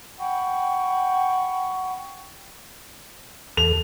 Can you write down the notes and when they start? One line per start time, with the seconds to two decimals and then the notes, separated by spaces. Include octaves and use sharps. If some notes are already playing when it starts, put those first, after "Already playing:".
0.18 F#5 G5 B5 C#6
3.57 E2 A4 F7